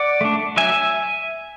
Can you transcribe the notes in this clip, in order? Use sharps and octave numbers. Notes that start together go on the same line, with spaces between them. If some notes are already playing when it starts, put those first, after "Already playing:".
Already playing: D5 F#5
A3 D4
F#3 E5 G#5